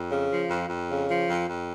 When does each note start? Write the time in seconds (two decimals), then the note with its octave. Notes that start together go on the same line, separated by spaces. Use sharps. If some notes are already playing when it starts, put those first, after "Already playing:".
Already playing: F2
0.09 C#3
0.29 F3
0.48 F2
0.69 F2
0.88 C#3
1.08 F3
1.28 F2
1.48 F2